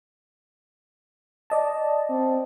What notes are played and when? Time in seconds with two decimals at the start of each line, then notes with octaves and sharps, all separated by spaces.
1.50 D5 D#5 A5
2.09 C4